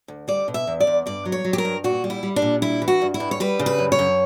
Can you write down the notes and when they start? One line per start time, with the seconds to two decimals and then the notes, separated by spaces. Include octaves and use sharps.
0.08 D2
0.28 G3 D5
0.48 B2
0.54 E5
0.67 E2
0.80 D5
0.87 E2
1.06 G2 D5
1.25 F#3
1.32 C#5
1.44 F#3
1.53 G4
1.58 A#4
1.65 G2
1.84 A#2 F#4
2.04 G3
2.10 E4
2.23 G3
2.36 D4
2.42 A#2
2.62 G3 E4
2.82 E3
2.88 F#4
3.02 G2
3.14 E4
3.20 G2
3.31 C#5
3.40 G3 B4
3.59 C#3
3.66 B4
3.78 F#2
3.92 C#5
3.99 F#2